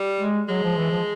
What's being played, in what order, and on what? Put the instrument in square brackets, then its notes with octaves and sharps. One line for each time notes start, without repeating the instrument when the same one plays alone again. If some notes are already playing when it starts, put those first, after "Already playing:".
Already playing: [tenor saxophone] G3
[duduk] G#3
[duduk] F#3 [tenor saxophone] G#3
[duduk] F3
E3
F3